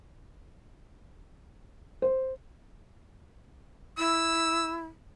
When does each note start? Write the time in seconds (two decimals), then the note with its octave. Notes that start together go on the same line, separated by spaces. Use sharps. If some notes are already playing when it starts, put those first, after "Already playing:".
2.02 C5
3.98 E4 E6